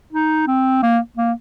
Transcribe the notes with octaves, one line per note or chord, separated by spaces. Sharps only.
D#4
C4
A#3
A#3